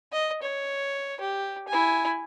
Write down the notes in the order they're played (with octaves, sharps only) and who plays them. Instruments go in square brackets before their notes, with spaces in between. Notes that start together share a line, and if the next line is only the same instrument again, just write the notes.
[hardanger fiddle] D#5
C#5
G4
E4 G#5